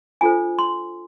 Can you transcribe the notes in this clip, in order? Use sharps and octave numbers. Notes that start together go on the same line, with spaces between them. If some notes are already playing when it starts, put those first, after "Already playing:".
D4 F4 A4 C5 G#5
C6